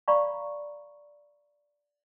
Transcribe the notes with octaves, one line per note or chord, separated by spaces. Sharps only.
D5 F5 A#5 B5 C#6